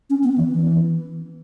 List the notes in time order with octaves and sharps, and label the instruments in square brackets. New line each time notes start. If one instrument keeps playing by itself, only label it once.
[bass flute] C#4
B3
E3
E3